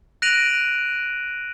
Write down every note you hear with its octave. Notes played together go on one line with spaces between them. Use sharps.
F#6 A#6 D7 D#7 F7 F#7